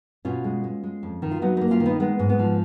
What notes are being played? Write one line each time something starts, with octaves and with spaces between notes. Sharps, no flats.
B2 C#4 F4
G#3
G#3
G#3
F2
D#3
F4
F#3 B3 D#4
A#3 B3 D#4
C#4 F4
D#3
B3 D#4
G#3 B3
G#2
B3
F3